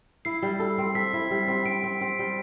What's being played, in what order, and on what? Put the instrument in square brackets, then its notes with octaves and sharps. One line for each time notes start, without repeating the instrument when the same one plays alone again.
[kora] E4 [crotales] C7
[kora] G3
A4
C4
[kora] A4 [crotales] B6
[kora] E4
G3
C4
[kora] C4 [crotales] D7
[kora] C4
C4
G3